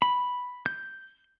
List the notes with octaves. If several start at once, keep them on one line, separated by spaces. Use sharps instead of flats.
B5
G6